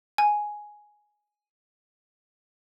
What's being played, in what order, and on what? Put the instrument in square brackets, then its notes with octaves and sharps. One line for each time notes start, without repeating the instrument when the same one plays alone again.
[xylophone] G#5